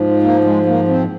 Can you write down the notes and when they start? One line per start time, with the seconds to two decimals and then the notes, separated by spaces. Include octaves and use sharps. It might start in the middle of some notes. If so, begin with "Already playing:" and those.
Already playing: G#2 F3
0.22 A#3
0.44 G#3
0.66 A#3
0.88 C4